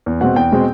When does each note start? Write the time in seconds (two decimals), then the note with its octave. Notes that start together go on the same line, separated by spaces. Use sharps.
0.06 E2
0.21 B2 G#3 C4 F#5
0.36 E2 G5
0.52 B2 G#3 C4